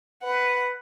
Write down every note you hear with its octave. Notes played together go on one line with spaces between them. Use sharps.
B4 F#5